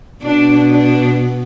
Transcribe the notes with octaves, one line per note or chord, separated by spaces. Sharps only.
B2 D4
D4